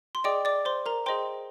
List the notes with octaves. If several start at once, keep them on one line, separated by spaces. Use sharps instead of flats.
C6
G#4 D5 D#5 G5 D6
D5 D6
C5 C6
A#4 A#5
G#4 C5 D#5 G5 C6